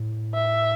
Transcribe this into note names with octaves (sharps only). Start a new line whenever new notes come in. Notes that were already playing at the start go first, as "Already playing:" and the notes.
Already playing: A2
E5